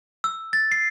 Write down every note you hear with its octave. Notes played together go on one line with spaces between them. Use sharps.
E6
A6
C7